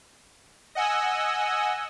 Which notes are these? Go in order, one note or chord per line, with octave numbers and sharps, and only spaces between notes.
D#5 F#5 G#5 E6